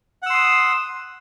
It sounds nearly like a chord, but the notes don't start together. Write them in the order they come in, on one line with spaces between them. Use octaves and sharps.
F#5 E6 C6 D#6